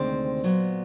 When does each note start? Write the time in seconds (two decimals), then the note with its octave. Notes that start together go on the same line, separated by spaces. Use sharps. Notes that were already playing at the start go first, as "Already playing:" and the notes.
Already playing: D2 C3 D#3 G#3 C4 C5 D5
0.44 A#2 F#3 B3